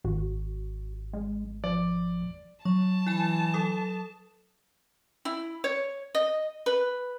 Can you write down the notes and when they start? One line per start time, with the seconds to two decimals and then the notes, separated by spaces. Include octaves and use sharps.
0.05 G#1 F#4
1.13 G#3
1.64 F3 D5
2.65 F#3 A5 C#6
3.07 E3 E4 G#5
3.54 F#3 A4 D#6
5.25 E4
5.64 C#5
6.15 D#5
6.66 B4